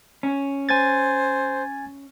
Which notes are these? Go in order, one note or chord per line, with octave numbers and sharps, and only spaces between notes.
C#4
C5 G#5 G#6 A6